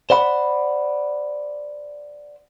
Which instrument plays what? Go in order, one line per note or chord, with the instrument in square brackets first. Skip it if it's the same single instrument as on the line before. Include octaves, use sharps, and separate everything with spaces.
[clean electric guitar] C5 D5 F#5 B5